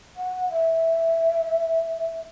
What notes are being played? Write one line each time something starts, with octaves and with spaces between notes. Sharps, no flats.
F#5
E5